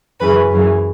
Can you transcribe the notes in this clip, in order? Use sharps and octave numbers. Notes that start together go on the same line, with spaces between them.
F#2 C#3 E3 B4
F#2 C#3 E3